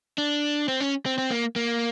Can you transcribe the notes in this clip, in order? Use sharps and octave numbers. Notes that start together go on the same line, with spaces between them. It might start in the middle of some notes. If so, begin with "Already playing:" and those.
D4
C4
C#4
C4
C4
A#3
A#3